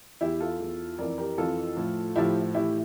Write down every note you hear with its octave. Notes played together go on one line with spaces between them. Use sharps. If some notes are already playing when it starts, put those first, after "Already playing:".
E2 E3 E4 G4
F4 A4
E2 E3
F2 E3 A#4 D5
G4 A#4
F2 E3 F4 A4
A2 F3
A2 F3 E4 G4
A2 E3 E4 G4